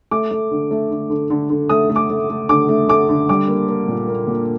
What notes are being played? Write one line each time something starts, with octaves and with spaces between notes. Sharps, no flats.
A3 D6
A3
D3
A3
D3
D3
D3
D3
A3 D#6
A3
D6
A3
A3
D3 D6
A3
A3 D6
D3
G3 D6
A#3
A#3
A#2
A#3
A#2